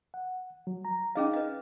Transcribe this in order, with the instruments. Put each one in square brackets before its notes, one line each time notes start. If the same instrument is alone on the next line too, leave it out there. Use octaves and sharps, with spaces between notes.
[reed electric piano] F#5
F#3
A#5
[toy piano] C#4 G#4 D#5 [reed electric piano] D#4 F5
[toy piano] B4 D#5